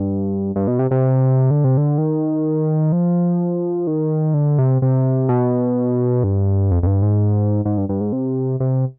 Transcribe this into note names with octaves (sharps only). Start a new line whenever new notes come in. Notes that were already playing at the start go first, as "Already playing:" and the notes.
Already playing: G2
G2
B2
C3
C3
D3
C3
D3
D#3
F3
D#3
D3
C3
C3
B2
G2
F2
F2
G2
G#2
G#2
G2
G2
G#2
C3
C3